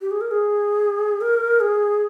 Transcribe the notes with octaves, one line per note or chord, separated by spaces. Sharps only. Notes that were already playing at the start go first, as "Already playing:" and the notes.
G4
G#4
A#4
G#4
A#4
G#4